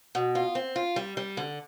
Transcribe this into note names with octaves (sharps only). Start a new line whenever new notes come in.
B2
F4
C4
F4
G3
G3
D3